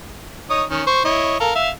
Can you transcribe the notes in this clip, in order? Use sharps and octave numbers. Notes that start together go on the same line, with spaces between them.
D#4 C#5 D#6
D#3 C#4
C5 C#6
E4 C#5 D#5
A4 A#4 F5
E5 F5